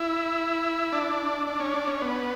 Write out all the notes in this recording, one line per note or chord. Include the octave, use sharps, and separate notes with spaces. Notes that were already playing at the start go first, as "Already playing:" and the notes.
Already playing: E4
D4
D4
C#4
D4
C#4
B3